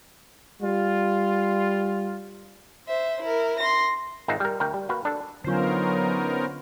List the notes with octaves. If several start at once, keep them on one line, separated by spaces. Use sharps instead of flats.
G3 F4
C5 E5
E4 A#4
C6 A#6
G#1 D#4 F4 G#4 E5 F#5
G3 A#4
D2 A#4 G5
G3
A#3 F#4 B4
D4 A4
D3 F#3 B3 C#4 D#4 F4 A#4 C5